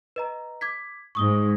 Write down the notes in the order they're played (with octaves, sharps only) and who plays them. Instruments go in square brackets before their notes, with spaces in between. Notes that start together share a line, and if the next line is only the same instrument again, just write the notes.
[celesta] B4 D#5 A#5
D6 G#6 B6
[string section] G#2 [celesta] C#6 D#6 G7